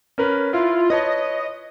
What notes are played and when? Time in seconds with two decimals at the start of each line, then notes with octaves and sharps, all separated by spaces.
0.18 C#4 A#4 B4
0.53 E4 F4
0.90 B4 C#5 D#5 A5